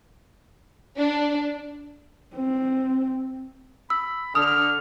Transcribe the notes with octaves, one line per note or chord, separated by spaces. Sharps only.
D4
C4
B5 E6
D3 D#6 F6